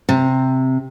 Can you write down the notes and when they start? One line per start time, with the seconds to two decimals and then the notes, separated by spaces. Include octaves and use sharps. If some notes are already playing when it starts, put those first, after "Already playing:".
0.09 C3